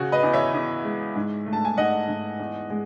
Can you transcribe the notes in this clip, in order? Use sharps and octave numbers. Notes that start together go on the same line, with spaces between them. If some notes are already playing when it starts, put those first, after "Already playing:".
Already playing: C#3 F#4
B4 D#5
E2
C#5 E5
E2
G#3
G#2
A3
A5
G#5
G#2 D#5 F#5
G#2
E2
G#3